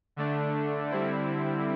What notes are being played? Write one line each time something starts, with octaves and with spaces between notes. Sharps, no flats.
D3 A3 D4
D3 G3 C4 E4